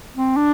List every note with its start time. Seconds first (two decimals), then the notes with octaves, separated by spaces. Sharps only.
0.16 C4
0.36 D4